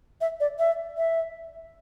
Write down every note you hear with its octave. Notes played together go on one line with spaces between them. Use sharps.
E5
D5
E5
E5